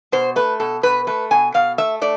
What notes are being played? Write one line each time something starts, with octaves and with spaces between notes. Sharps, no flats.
B2 C5
A3 B4
B2 A4
B2 B4
A3 B4
B2 G#5
B2 F5
A3 E5
A3 D5